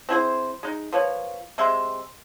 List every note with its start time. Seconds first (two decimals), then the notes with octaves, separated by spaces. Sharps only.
0.09 C4 E4 G#4 C5
0.63 G#3 D#4
0.93 F3 A#3 B4 C#5
1.58 C3 G#3 E5 C6